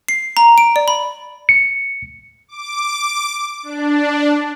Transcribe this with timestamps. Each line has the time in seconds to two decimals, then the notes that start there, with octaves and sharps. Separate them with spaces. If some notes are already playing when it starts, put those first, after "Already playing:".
0.09 C7
0.37 A#5
0.58 D7
0.76 D5
0.88 B5
1.49 C#7
2.48 D6
3.63 D4